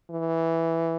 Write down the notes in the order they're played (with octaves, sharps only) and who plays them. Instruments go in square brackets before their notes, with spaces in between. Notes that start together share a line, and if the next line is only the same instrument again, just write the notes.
[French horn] E3